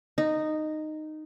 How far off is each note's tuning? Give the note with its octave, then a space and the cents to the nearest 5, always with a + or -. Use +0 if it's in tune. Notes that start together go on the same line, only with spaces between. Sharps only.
D#4 -10